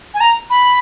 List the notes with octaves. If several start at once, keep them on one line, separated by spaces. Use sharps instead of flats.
G#5
A#5
B5